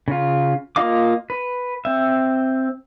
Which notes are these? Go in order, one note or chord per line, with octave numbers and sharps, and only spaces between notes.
C#3 F4
A#3 F4 D#5 F5 D6
B4
C4 E5